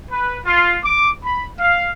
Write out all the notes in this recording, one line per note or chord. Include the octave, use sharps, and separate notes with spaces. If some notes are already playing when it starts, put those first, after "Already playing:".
B4
F4
D6
B5
F5